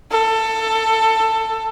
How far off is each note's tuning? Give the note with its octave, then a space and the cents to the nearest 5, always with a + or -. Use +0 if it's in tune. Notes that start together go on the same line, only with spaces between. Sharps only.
A4 +15